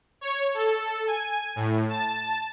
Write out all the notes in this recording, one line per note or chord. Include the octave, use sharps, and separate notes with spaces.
C#5
A4
G#5
A2
A5